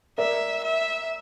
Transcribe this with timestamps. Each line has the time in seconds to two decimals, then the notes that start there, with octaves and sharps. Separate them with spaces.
0.18 A#4 D5 E5
0.64 E5